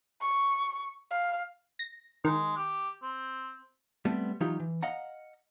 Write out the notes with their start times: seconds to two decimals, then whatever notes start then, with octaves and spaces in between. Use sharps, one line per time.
0.21 C#6
1.11 F5
1.79 A#6
2.25 D#3 G#3
2.57 G4
3.03 C4
4.05 G3 A3 B3 C4
4.40 E3 F#3 D#4 F4 G4
4.60 E3
4.83 D#5 F5 F#5 A#5